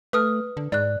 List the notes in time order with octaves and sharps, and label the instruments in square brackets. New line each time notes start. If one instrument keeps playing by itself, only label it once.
[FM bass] A3 [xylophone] B4 D#6 F6
[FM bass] D3
[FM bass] G#2 [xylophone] D5 F#6